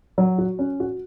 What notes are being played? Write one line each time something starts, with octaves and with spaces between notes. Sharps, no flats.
F#3
F#4
C#4
F#4